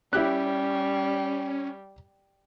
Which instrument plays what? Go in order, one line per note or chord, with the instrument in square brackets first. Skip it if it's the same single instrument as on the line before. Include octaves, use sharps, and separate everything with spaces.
[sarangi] G3 [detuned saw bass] C#4 [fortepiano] E4 G4 F#6